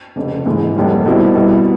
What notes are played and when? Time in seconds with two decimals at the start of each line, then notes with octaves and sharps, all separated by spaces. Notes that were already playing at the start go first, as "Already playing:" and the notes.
0.16 F1 F2 C#3
0.46 G#2 E3 G#3
0.76 F1 D#2 D#3 G3
1.05 B2 G3 C4 E4
1.35 B2 G3 B3 E4